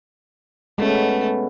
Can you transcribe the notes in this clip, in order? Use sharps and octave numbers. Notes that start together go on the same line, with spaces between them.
B2 G#3 A3 C#4